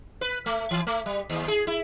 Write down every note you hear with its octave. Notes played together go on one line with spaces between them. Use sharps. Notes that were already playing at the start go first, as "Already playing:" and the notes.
B4
A3
E3
A3
G3
D#2
G#4
E4